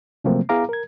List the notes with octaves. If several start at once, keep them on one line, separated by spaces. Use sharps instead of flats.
C3 F3 F#3 A3 A#3 C4
B3 E4 G#4 F5 A#5 D6
A#4 G#6